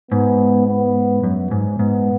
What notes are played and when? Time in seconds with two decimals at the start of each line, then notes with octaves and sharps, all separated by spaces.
0.11 G#2 B3
0.67 B3
1.23 F#2
1.51 G#2
1.78 G#2 B3